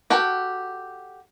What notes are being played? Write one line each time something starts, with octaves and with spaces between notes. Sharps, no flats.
F#4 G4 A4 G5